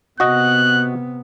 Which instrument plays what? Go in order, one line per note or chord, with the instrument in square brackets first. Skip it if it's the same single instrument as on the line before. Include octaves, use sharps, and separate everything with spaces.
[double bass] C3 B3 [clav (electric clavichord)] F#4 D#5 [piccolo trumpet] F#6